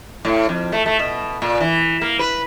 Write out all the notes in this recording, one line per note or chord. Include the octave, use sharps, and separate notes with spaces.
A2
F2
A3
A3
B2
A#2
E3
A#3
B4